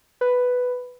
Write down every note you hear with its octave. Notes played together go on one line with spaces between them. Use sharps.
B4